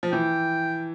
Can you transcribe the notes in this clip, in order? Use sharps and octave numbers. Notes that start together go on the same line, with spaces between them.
F3
E3 G5